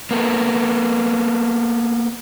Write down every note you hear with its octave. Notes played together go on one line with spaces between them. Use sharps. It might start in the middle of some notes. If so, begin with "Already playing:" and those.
A#3 B3 A4